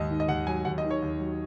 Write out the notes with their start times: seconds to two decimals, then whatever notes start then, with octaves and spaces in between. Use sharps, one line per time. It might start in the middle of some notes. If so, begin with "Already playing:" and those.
Already playing: D#2 G#2 D#5
0.10 D#3
0.20 D#5
0.28 D#2 F#5
0.47 F#3 G#5
0.65 D#2 F#5
0.78 D#5
0.84 D#3
0.91 C#5
1.02 D#2
1.20 F#3